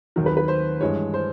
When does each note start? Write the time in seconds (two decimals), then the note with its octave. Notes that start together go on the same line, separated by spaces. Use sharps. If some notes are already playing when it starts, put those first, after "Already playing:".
0.16 D#2 D#3 F#3
0.26 B4
0.37 B4
0.48 C5
0.81 G2 E3 G#3 C#5
1.14 C5